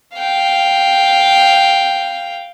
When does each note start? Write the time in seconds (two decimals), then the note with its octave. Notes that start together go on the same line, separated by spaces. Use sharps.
0.17 F5 G5